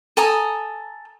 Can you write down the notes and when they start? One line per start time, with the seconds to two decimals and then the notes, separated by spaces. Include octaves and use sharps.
0.17 A4 G#5 A#5 D#6